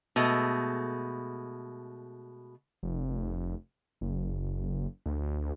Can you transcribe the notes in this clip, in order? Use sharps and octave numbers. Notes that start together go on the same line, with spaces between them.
B2 G#3 A3
F1
F#1
D2